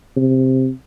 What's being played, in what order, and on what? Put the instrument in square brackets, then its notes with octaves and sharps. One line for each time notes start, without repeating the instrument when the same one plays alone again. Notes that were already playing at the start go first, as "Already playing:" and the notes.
[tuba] C3